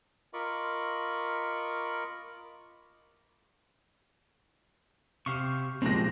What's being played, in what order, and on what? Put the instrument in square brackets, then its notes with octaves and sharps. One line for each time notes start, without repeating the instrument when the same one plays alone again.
[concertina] F4 A#4 D#5 B5 C#6 D6
[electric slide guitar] C3 [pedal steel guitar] G4 F5 C#6
[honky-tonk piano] A#2 A#6 [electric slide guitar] F3 G#3 [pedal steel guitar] C4 G4